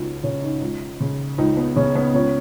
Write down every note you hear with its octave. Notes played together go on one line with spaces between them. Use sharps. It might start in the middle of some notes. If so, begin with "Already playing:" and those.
Already playing: C#2 C#3 D#4 F4 F#4
C#3 C#4
D#4
C#2
C#3
C#2 D#4
B3
C#3 C#4
B3
C#2 C#4